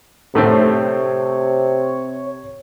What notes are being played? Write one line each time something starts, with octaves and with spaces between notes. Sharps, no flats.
A2 C3 A3 C4 C#5